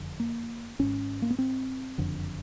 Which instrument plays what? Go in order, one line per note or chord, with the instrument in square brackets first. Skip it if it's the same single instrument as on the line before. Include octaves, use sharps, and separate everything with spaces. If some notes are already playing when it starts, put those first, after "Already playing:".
Already playing: [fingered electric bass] F#1 F2 D3
A#3
G#1 G#2 C#4
A#3
B3
C4
F#1 F2 D3